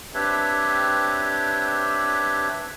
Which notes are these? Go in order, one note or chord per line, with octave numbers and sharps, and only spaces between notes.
C4 D4 G4 B4 C#5 E5